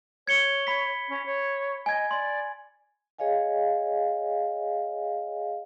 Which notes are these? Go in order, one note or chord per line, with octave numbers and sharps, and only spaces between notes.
C#5 G#6 C#7 G7
B5 B6
C#4
C#5
D#5 G#5 G#6
D5 C6
G#4 C#5 D#5 F5 G#5